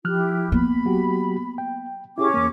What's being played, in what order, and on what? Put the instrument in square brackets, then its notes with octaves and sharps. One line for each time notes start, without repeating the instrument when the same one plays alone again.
[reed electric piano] F3 F6 F#6 [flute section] E4 G4
[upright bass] A#3 B3 [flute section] B5
[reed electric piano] F#3 F#4 G4
G5
[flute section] C#4 D6 [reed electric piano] E4 G4 G#4
[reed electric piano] E2 A#3